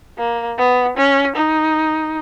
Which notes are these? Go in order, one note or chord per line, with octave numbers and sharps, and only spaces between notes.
A#3
B3
C#4
D#4